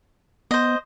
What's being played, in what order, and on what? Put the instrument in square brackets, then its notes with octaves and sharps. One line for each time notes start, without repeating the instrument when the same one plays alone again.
[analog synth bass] B3 [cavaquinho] C5 D#5